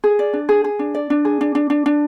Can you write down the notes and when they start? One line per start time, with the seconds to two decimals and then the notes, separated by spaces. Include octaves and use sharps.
0.04 G#4
0.19 D5
0.33 D4
0.49 G#4
0.64 G#4
0.79 D4
0.95 D5
1.10 D4
1.25 G#4
1.41 D4
1.55 D4
1.70 D4
1.86 D4